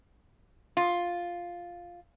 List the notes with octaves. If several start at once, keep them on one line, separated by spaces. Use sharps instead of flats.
F4